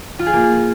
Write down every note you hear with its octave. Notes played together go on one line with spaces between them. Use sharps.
F4
G#4
A#3